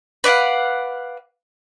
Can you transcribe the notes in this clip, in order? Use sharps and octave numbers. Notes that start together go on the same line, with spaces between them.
B4 D5 F5 F#5